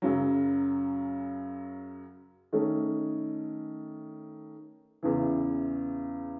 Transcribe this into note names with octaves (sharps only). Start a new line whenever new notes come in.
F#2 C#3 F#3
D#3 A3 C#4
E2 C#3 E3